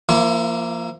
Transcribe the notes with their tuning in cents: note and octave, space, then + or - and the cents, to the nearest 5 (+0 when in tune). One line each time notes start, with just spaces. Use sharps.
F3 -20 A#3 +0 E4 +25